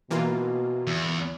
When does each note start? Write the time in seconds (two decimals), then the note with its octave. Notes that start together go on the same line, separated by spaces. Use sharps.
0.11 B2 E3 A#3 F4
0.87 E2